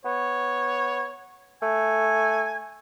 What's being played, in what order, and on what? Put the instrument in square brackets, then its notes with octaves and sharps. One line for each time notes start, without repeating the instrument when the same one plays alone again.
[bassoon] B3 [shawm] C#5
[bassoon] A3 [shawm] G#5